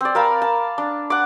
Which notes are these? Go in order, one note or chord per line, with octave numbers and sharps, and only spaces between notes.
C4 D5
A#4 F5 A5 B5
A5
D4
F#5 D6